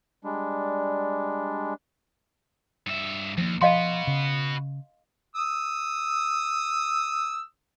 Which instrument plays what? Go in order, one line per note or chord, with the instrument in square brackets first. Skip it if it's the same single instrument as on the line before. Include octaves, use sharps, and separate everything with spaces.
[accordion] G3 G#3 D4
[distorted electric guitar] G2 E5
[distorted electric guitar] D#2 [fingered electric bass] F3 A#3
[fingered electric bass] F3 [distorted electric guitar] F#4 B4 [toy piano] D#5 F5 C6
[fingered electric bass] C#3
[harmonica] D#6 E6